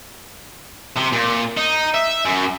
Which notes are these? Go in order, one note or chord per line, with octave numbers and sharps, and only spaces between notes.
C3
A#2
D#4
E5
F#2